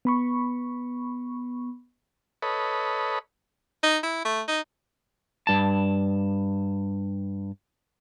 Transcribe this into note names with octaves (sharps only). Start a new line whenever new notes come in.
B3 B5 C#6
A4 B4 C#5 D#5 B5
D#4
E4
A3
D#4
G2 A5